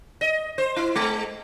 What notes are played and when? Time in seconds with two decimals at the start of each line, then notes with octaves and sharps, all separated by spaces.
0.21 D#5
0.58 C5
0.76 E4
0.96 G#3